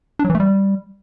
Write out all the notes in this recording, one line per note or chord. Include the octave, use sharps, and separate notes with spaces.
D4
F#3
E3
A3
G3